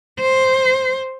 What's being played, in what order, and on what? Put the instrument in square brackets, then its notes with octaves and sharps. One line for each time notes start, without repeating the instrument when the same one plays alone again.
[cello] C5